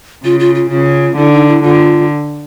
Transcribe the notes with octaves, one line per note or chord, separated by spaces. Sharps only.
C#3 F4
F4
F4
C#3 F4
D3 E4
D#4
E4
D3 F4